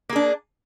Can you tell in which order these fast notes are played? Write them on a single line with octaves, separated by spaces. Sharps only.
A#3 G#4 D4